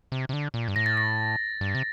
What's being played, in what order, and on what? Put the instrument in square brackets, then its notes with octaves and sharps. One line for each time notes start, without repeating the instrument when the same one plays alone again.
[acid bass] C3
C3
D3
A#2
G2
[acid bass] A2 [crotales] A#6
[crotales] A6
A#6
[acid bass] G2
C3